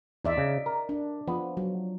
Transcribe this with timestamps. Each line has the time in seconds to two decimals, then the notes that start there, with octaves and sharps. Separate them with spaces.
0.25 E2 D#4 D5 E5
0.37 C#3
0.66 A#4
0.89 D4
1.28 F3 B3
1.57 F#3